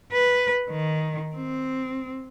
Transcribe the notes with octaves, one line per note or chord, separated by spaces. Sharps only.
B4
D#3
C4